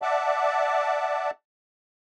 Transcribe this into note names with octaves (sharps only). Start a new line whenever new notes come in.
D5 E5 F#5 A5 D6